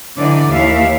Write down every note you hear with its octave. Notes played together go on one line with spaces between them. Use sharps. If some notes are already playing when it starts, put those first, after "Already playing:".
D3 E3 D#4 D5
D#2 E4 E5 F5